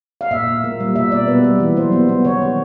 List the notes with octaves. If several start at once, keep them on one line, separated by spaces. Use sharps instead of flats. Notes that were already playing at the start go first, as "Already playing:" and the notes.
F5
A#2 E5
A#2
A#3
G3
B2 E5
B2 D5
B3 B4
G3
E3
F#3 C5
B3
B3
D#3 C#5
D#3